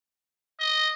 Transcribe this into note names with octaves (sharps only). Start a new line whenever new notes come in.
D#5